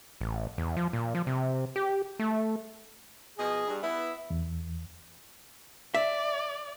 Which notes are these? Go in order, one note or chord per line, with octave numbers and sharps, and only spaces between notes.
A1
E2
F3
A#2
F3
C3
G4
A3
B2 F3 G#4 D#5
G2
B3 E4 E5
E2
D5 E5